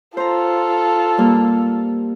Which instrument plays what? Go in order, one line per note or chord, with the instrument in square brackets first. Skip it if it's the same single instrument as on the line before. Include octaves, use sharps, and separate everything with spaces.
[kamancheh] F4 A4 [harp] C5 A#5
[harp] G3 A#3